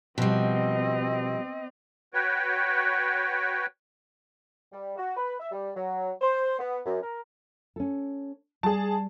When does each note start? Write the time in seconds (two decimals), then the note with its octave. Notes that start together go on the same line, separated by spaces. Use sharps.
0.18 B2 F3 G3 C4 D#5
2.14 F#4 B4 C#5 G5
4.72 G3
4.97 F#4
5.17 B4
5.40 E5
5.51 G3
5.76 F#3
6.22 C5
6.59 B3
6.86 F#2
7.02 A#4
7.76 C#4 A4
8.63 G3 G#4 A5